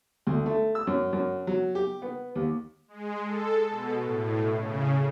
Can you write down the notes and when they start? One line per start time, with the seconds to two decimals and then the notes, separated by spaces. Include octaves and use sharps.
0.27 D2
0.46 A3
0.75 E6
0.87 F#2
1.13 F#2
1.47 F#3
1.75 G4
2.02 B3
2.35 D#2
2.88 G#3
3.24 A4
3.69 B2
4.04 A2
4.55 C#3